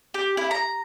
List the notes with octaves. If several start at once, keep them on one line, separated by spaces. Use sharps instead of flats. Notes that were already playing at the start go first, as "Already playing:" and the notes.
G4
E4
A#5